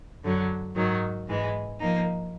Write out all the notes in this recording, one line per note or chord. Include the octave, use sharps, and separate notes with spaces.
F#2 D3 F#3
G#2 D#3 F#3
G#2 E3 G#3
F3 A#3 D#4